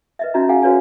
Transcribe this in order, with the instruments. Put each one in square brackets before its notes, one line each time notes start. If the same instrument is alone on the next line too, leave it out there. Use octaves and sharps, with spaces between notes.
[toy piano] B4 D#5 E5
C#4 D#4 F#4 E5 A#5
G#4 F5 F#5 G#5
F#4 B4 C#5 D5 G#5